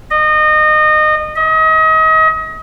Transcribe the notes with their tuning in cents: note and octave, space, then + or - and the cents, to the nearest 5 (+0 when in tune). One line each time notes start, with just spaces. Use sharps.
D#5 -25
D#5 +35